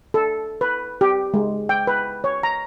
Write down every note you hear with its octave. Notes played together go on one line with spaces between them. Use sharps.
A4
B4
G4
G#3
G5
B4
C#5
A#5